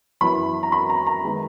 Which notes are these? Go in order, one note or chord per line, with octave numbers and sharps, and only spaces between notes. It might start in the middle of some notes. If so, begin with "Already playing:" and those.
F#2 E3 B3 B5
A#5
B5
A#5
A#5
D#3 G#3 B3